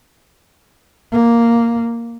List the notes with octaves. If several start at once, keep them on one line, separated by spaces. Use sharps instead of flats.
A#3